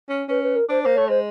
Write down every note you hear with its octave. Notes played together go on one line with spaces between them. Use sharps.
C#4
C#4 B4
B4
A#4
D4 C5
A#3 C5
A3 C#5
G#3 C5